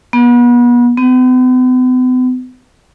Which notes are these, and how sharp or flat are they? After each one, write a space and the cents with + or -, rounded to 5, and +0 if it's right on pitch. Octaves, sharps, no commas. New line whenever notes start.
B3 -35
B3 +45